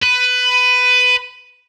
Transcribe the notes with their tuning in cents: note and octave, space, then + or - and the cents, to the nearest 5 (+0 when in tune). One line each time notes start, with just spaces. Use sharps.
B4 +15